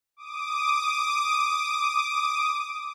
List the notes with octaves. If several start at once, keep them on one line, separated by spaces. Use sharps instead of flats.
D6 D#6